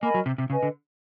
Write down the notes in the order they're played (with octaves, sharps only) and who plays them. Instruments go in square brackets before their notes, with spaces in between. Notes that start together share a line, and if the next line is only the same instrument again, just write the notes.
[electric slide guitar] A#3 [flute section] A#4 D#5 G#5 B5
[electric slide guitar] F#3
C3
C3
[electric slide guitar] C#3 [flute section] B4 D#5 G#5
[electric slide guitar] D3